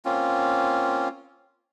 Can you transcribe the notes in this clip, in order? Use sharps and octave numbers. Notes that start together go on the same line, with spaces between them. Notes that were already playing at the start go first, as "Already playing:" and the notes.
A#3 C4 C#4 F4